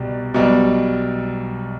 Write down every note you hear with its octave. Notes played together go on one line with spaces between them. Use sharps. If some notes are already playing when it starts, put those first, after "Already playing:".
Already playing: C2 B2 G3
B1 B2 G3